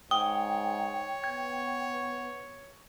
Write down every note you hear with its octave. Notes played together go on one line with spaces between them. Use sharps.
G#2 C#5 G5 D#6
B3 G#6